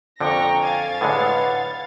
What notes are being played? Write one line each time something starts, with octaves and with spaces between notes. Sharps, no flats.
F2 D3 F3 A#3 G5 A#5 C#6 A#6
F5 G#5 G#6 A6
A2 D3 G#3 B4 F#5